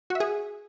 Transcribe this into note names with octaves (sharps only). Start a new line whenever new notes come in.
F#4
E5
G#4